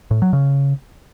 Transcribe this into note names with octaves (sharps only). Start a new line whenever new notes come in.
A2
F#3
C#3